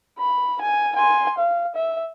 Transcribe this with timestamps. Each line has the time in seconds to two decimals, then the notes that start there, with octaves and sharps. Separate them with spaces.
0.18 B5
0.61 G#5
0.96 G#5 C6
1.38 F5
1.75 E5